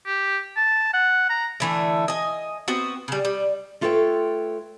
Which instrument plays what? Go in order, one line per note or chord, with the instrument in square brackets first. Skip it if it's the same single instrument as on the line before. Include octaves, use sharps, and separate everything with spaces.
[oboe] G4
A5
F#5
A#5
[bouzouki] D3 E3 A3
D#5 G#5
B3 C4 F#4
C#3 G3
G3
[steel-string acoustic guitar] A3 F4 A4 B4 C#5 G5